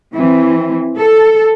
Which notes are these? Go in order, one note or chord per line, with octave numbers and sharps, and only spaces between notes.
E3 C4
A4